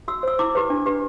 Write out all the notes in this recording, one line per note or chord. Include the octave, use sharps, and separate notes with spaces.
F#4 E6
C5 E6
E4 D6
G4 B4
D4
G4 B4